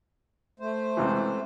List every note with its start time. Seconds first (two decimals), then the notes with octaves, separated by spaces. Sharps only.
0.60 A3 C5
0.97 C#2 C3 E3